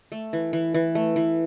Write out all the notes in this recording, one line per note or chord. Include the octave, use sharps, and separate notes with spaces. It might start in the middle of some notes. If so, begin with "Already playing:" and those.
A3
E3
E3
E3
A3
E3